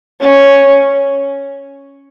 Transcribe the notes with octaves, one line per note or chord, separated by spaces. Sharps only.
C#4